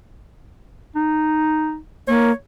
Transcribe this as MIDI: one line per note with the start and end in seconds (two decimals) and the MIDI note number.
0.96 1.77 63
2.08 2.31 58
2.08 2.33 73